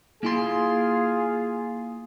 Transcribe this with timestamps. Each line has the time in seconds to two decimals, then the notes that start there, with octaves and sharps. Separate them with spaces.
0.23 A#3 E4 F4 G#4 C6